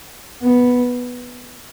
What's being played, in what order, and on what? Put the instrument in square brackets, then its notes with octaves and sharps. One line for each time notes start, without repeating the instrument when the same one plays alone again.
[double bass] B3